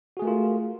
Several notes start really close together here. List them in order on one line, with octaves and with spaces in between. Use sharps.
F#4 G#4 A3 A#4 F4